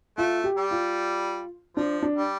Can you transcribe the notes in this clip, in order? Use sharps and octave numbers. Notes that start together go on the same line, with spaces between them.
A3 F4
G4
G3
F4
F3 D4
D4
G3